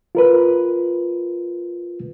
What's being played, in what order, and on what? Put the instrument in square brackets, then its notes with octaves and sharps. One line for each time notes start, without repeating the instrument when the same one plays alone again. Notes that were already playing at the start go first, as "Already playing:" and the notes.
[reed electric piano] F4 A#4 B4